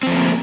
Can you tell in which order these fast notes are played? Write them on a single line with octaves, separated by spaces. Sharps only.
C4 F3 A3 A#3